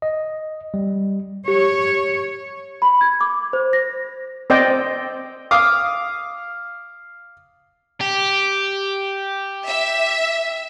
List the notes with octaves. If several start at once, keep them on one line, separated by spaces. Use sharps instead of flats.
D#5
G3
G4 C#5
B5
G#6
D6
C5
A#6
C4 C5 D5 D#5 G5
F5 D6 D#6
G4
E5